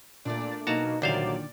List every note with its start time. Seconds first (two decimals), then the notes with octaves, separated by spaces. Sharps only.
0.25 A#2 A3 D4 D5
0.67 B2 F#3 A#3 D#4 F#4 A5 A#5
1.02 C2 A#2 D3 D#3 F#3 C5 D5 F5